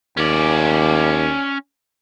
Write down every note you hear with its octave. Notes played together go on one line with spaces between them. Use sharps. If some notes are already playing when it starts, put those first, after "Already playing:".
D#2 C#4 D5